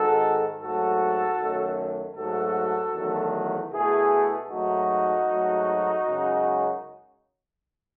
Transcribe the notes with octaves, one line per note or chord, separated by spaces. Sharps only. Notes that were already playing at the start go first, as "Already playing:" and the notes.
Already playing: G#2 D#3 G#3 F#4 A4
G#2 F#3 A3 F#4 A4
F#2 D#3 A3
G#2 F#3 A3 F#4 A4
E2 D#3 F#3 A3
B2 A3 E4 G#4
G#2 F#3 A3 D#4 F#4
G#2 F#3 A3
F#2 C#3 G#3